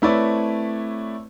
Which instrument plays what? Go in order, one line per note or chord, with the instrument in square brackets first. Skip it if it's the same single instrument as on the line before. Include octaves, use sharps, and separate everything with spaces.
[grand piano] A3 C4 E4 B4 C#5 D5